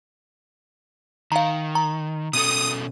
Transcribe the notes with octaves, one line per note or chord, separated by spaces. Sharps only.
D#3 F5 A#5
A#5
B2 C#4 A4 D#6